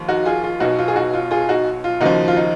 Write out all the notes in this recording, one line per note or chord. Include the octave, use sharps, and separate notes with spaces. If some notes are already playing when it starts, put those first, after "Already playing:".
Already playing: D#2 F3
D#4 F#4
F4 G#4
F4
B1 B2 D#4 F#4
F4
G#4
D#4 F#4
F4
F4 G#4
D#4 F#4
F4
D#2 C#3 F3 D#4 F#4
F4
D#4